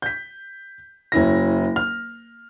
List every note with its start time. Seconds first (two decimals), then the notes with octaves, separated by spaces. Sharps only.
0.02 G6 B6
1.12 F#1 C#4 E4 A#6
1.76 F6